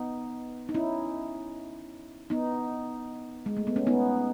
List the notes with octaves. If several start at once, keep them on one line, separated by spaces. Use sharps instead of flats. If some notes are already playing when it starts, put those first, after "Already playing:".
Already playing: B3 D#4
D#4
C#4 E4
B3 D#4
G#3
A3
B3
C#4
B3 D#4